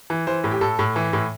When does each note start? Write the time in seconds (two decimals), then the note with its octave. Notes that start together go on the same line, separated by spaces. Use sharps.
0.10 E3
0.27 E3 C5
0.44 A2
0.51 G4
0.61 A2 A4
0.79 A2
0.96 E3
1.13 A2